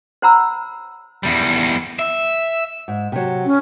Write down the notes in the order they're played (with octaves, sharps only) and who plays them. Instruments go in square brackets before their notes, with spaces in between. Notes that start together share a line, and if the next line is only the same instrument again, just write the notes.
[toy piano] C5 C#5 F#5 A#5 B5 E6
[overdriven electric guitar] E2 G3
E5
[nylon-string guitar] G#2
C3 F#3
[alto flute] C#4